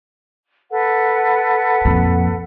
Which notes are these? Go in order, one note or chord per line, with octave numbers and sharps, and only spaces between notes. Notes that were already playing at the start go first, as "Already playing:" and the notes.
A4 B4 F#5
F2 A#2